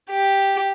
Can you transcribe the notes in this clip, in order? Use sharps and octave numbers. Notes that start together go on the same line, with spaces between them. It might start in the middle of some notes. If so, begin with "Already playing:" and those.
G4